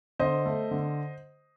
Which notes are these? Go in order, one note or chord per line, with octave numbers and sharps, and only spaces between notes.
D3 C5 D#5
A3
D3